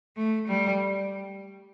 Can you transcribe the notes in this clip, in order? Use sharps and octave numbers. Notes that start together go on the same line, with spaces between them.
A3
G3